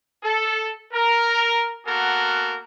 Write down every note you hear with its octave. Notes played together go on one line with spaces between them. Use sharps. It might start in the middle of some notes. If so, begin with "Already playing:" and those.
A4
A#4
A#3 B3 F#4 A4 A#4